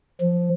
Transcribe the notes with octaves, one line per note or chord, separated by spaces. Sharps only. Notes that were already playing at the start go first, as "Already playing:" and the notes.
F3